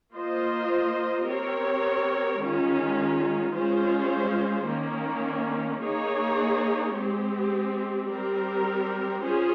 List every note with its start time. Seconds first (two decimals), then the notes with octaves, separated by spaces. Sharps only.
0.13 A#3 F4 C5 D#5
1.27 C4 G4 A#4 C#5
2.41 D#3 G#3 C#4 F4
3.54 G#3 C#4 F4 C5
4.68 D#3 A#3 C#4
5.82 A#3 D#4 G#4 C#5
6.95 G#3 C4 G4
8.09 G3 C4 G4 A#4
9.23 C#4 F4 G#4 C5